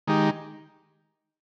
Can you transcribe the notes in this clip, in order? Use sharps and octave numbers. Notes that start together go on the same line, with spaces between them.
D#3 G#3 D#4 G4